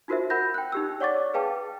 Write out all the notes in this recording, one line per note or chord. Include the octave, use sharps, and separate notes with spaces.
D#4 F4 F#4 A#4 C5 E5
A#4 F#5 B5 G6 A#6
G5 F#6
D#4 G4 E6
C#5 D5 F#5 C#6 D6 A6
G#4 B4 F5 G5 A5